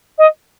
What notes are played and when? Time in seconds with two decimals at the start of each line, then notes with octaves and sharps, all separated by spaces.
0.18 D#5